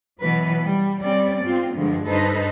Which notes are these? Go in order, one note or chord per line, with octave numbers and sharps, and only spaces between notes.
B2 E3 F#3 B4
G3
G3 C4 C#4 D5
G#2 C4 F4
G2 D3 F3 G#3
G2 D#4 A4 B4 C5